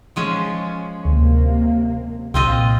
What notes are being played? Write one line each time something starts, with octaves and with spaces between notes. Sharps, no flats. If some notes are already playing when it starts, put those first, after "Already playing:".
F3 G#3 C#4
D2 C3 A#3
C2 A#2 C4 F4 D#5